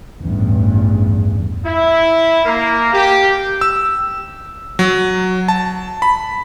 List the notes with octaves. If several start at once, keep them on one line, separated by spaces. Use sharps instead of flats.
A1 E2 G2
E4
A#3
G4
E6
F#3
A5
B5